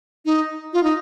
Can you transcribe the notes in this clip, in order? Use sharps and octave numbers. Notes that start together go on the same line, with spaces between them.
D#4
F4
D#4